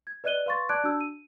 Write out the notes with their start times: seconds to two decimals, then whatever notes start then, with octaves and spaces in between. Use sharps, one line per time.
0.07 G#6
0.24 B4 D5 D#5 F#6 D#7 G7
0.46 B4 F5 C6 C#6 A6
0.69 D5 A5 D6 F#6 G#6 D7
0.84 D4 F#4 A5 E6 G6
1.01 D#7